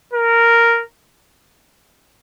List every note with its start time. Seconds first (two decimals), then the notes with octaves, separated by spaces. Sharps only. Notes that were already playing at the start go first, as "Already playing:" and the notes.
0.13 A#4